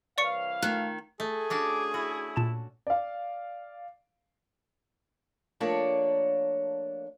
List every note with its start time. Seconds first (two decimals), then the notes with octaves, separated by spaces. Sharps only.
0.18 C2 E3 B4 C#5 D5 F5 C#6 C#7
0.62 D#3 A3 F4 F#6
1.20 A3 G#4
1.50 C#4 D4 F#4 D6
1.94 E4 F#4
2.36 A#2 A5 E7
2.87 D5 F5
5.60 F3 A3 A#3 D4 C#5 D5